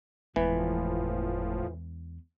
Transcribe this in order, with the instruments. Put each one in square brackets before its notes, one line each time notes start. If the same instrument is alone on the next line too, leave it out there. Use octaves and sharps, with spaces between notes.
[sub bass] F#1 [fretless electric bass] E2 G#3 B3 [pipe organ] A2 F3 [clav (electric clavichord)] E3